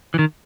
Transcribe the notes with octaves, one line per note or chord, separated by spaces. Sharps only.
E3
D#3